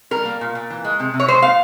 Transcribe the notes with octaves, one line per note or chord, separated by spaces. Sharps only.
G3 A#4
A#3
A#2
A#2
E3
G#3
C3
C3
C#5
G#3 C5
A#2 F5